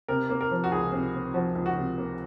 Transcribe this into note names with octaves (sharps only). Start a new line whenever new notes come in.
C3 A#4
A#3
A#4
F3
F#4
C#2 G#4
C3
A#3
F3 F#4
C#2
F#4
C3
A#3